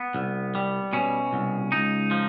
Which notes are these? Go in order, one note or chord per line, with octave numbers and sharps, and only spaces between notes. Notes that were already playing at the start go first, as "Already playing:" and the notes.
Already playing: B3
C2
G3
B2 C#4
C2
C#2 D#4
F3